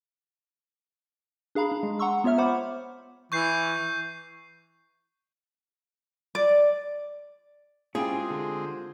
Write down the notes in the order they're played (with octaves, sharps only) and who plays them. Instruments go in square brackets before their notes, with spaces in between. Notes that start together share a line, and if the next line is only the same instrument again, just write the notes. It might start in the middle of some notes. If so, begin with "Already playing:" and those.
[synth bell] D4 G#4 F5 A#5 B5
D4
G#3
F#5 A#5 C6 C#6 E6
B3 F4 C#5 E5 F6
C5 F#5 B5 D6
[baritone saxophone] E3 [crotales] C#6 G6 C7
[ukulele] D5
[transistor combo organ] G#3 C4 [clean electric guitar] C#4 E4 G5 [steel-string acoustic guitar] F4 [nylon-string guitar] G4 G#4
[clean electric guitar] D3